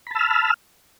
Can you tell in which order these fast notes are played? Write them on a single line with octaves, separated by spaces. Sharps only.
B5 A5 E6 F6